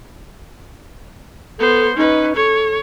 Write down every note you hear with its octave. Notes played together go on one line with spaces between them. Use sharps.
B3 A4 C5
C#4 D#4 B4
A4 C#5